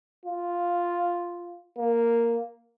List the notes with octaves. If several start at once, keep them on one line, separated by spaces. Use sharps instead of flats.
F4
A#3